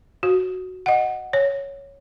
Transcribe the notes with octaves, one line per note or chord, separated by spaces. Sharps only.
F#4
D#5 F#5
C#5